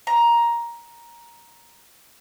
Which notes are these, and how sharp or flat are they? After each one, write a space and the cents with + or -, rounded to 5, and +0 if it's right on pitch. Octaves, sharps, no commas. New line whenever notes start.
A#5 +10